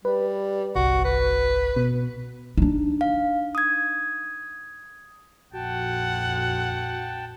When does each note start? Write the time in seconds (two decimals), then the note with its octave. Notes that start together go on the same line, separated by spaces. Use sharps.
0.05 G3 B4
0.75 G1 C2 F#4
1.04 B4
1.76 B2
2.58 D4 D#4
3.01 F5
3.55 D#6 G#6
5.53 A#1 F2 F#4 F#5 G5 A5